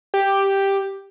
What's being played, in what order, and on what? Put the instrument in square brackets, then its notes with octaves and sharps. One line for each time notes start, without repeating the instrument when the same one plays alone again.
[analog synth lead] G4